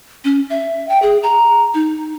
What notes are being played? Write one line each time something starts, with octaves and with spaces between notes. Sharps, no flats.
C#4
E5
G5
G#4
A#5
D#4